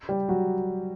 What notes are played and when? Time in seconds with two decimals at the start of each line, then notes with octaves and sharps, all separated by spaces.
0.09 G3 G4
0.28 F#3 F#4